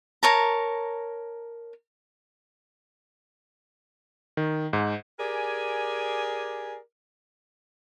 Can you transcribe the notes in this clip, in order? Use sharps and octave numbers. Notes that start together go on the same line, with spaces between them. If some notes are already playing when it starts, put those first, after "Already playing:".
A#4 C#5 A5 A#5
D#3
G#2
G4 G#4 A#4 D5 G#5